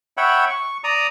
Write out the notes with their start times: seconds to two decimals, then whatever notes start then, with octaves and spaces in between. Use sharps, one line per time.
0.17 C#5 E5 F#5 G5 B5
0.50 C#6
0.84 D5 A#5 D#6